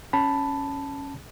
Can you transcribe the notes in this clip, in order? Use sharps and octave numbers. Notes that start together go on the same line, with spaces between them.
C#4 A5 B5